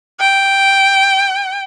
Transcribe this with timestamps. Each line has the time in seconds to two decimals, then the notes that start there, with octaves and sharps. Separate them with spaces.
0.20 G5